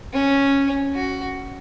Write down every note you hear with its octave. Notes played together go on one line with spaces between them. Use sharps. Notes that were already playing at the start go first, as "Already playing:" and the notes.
C#4
F#4